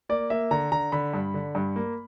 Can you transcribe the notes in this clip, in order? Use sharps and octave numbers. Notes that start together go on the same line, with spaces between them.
A#3 D5
A#3 E5
D3 A#5
D3 A#5
D3 B5
G2
D3
G2
A#3